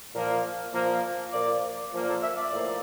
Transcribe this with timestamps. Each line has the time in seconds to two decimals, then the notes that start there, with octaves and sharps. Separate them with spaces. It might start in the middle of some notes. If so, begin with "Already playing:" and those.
0.14 A#2 F3 A#3
0.74 A#2 F3 A#3
1.33 A#2 F3 A#3 D5
1.93 A#2 F3 A#3
2.07 A4
2.23 E5
2.37 D5
2.52 A2 F3 A#3